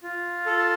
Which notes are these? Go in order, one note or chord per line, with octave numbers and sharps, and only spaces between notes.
F4
A4